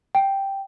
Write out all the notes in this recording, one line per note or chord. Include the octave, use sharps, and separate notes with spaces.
G5